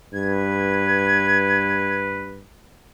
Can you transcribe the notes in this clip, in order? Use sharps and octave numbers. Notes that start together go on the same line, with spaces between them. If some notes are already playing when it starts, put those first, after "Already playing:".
G2 B4 G#6